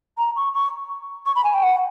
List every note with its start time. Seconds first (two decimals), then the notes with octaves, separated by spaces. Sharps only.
0.18 A#5
0.36 C#6
0.54 C#6
1.26 C#6
1.35 B5
1.44 G#5
1.54 G5
1.63 F#5